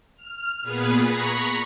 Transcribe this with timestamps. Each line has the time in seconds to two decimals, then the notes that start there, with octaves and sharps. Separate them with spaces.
0.16 F6
0.62 A#2 B3 G#4 B4
1.04 A#5 B5 C#6